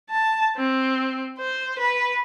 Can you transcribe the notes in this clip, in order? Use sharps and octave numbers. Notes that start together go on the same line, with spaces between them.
A5
C4
C5
B4